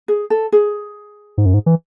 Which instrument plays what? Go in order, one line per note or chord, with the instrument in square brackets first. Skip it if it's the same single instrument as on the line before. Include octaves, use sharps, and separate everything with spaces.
[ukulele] G#4
A4
G#4
[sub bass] G#2
F#2
G#2
E3